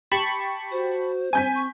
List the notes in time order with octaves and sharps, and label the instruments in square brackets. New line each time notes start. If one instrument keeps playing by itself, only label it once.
[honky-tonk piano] G4 [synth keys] A5 B5 C#6
[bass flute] F#4 [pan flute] C5
[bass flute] C4 [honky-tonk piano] G#5 G6 B6
[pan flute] C#6